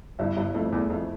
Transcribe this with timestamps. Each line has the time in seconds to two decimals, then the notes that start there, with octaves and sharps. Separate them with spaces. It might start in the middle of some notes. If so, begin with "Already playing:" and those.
0.19 G1 G2 E4
0.36 G1 G2 E4
0.54 F2 A3
0.72 E2 E4
0.90 F2 A3